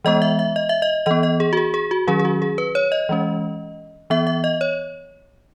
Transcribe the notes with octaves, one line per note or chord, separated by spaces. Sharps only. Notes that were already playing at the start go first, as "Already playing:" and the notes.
E3 G#3 B3 D#5
E5
E5
D#5
E5
D#5
E3 B3 D#5
D#5
G#4
F#4
G#4
G#4
F#4
D#3 F#3 C#4 G#4
G#4
F#4
G#4
B4
C#5
D#5
E3 G#3 C#4
E3 B3 E5
E5
D#5
C#5